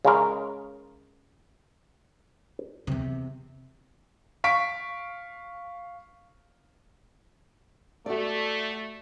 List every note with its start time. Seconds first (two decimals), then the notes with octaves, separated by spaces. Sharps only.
0.05 C#3 G#3 A#4
2.87 E2 C3
4.44 F5 C#6 B6 D7
8.06 A3 F#4 D5